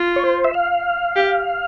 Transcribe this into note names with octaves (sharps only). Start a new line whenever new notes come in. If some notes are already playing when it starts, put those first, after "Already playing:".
Already playing: F4
C#5
C5
E5
F5
G4